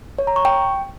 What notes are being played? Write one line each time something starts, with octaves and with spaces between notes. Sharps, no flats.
C#5
A#5
C#6
G5